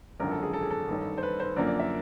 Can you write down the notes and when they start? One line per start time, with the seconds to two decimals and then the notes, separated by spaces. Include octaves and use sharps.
0.20 G#1 F#2 D3 F3 A#4
0.31 A4
0.43 G#4
0.53 A4
0.62 G#4
0.70 A4
0.88 A1 G2 D#3
1.18 C5
1.23 B4
1.40 C5
1.56 F#2 D3 F3 A#3 D5
1.67 D5
1.79 E5